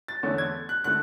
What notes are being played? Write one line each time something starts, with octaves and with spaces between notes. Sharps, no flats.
A6
E2 D3 A3 C#4
G#6
F#6
D3 A3 F#6